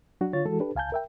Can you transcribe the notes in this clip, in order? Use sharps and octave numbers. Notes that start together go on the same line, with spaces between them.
F#3 D4 F#4
D3 F4 C#5 A6
E3 G#3 F#4 A4
D4 G4 A4 B4
C#2 F5 G#5 A5 G6
A#4 E5 G5